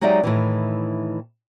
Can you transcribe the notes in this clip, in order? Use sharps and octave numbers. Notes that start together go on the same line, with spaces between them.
F#3 G#3 D#4 G4 D5 E5
A2 D#3 E3